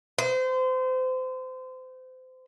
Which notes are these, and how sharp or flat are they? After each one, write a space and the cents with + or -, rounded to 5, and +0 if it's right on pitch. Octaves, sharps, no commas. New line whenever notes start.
C5 -30